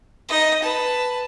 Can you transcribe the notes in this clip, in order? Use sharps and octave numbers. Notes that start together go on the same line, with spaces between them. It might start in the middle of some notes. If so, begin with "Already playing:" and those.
D#4 D#5
B4 A5